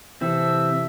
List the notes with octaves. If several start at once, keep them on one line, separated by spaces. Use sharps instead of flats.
C3 E3 C4 A4 E5